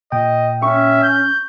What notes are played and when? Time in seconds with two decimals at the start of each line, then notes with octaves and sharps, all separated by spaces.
0.12 A#2 D#5 G5
0.62 C#4 E5 C#6
1.03 G6